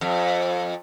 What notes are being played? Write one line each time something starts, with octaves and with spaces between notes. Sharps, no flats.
F2